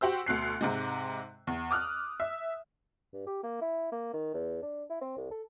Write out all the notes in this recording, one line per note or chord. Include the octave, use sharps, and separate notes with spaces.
F#4 G4 C5 E6
D2 B2 F#6 C7
G#2 C3 G#3
E2
D6 D#6 F6 F#6
E5
G2
G4
A#3
E4
A#3
D#3
E2
D4
E4
C4
C2
A4